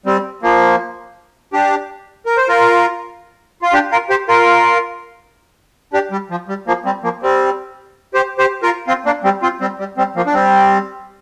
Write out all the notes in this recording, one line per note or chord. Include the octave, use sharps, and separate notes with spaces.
G3 C4
F3 A#3
D4 G4
A#4
C5
F4 A#4
F4
D4 G4
F4 A#4
G4 C5
F4 A#4
D4 G4
G3
F3
G3
F3 A#3
G3 C4
F3 A#3
G3 C4
G4 C5
G4 C5
F4 A#4
C4 F4
A#3 D4
G3 C4
C4 F4
G3 C4
G3
G3 C4
F3 A#3
D4
G3 C4